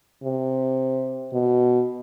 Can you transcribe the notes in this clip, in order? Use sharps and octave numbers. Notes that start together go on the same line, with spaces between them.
C3
B2